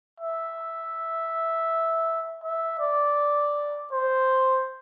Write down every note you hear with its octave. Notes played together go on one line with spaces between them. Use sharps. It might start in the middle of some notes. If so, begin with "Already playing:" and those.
E5
E5
D5
C5